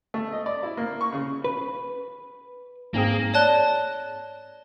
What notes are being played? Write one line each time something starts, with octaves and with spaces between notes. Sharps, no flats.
A3
D#5
D5
E4
A#3
C#6
C#3
B4
G#2 A#3 C4 G#4
C#5 D5 A5 F#6 G7